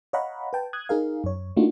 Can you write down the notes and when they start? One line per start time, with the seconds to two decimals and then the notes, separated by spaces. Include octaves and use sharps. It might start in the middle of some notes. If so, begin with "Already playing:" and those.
0.13 C#5 D#5 F5 F#5 A#5 B5
0.53 B4 G5 A5
0.73 D#6 F#6 G#6
0.89 D#4 G#4 A#4 F5
1.24 F#2 C#5
1.57 A3 A#3 D4 D#4 F4 F#4